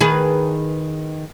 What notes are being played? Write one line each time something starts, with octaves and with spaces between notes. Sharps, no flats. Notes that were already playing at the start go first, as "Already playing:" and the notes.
D#3 G#4 B4